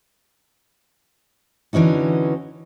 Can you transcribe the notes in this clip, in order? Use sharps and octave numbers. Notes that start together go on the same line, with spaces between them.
D3 E3 C#4 D#4 F#4